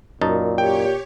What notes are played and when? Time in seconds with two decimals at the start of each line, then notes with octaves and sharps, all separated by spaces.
0.21 F#2 A#2 D#4 A5
0.58 G4 C#5 G5